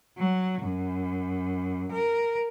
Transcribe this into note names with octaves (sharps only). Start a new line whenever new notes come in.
F#3
F#2
A#4